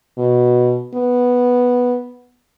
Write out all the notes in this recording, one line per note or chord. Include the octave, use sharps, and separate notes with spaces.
B2
B3